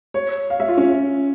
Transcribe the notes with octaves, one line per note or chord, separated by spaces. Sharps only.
C#5
F5
E5
F4
C#4